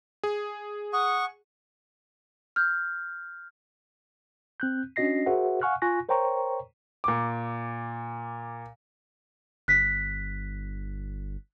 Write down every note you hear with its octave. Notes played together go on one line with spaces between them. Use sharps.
G#4
F#5 C#6 D#6
F6 G6
C4 F#6 G6
C#4 D4 F#4 D#5 A#6 C7
F#4 G#4 A#4 C5 E5 F#5
F5 F#5 G#5 C#6 F6 F#6
F4 G#5 C#6 F#6 A#6
A#4 C5 C#5 G5 A#5 C#6
A#2 D6
G1 F#6 B6